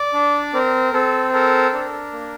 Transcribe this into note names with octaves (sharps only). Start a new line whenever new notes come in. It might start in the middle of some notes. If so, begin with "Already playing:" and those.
Already playing: D5
D4
C4 A#4
C4 A4
A4 A#4
D4
A#3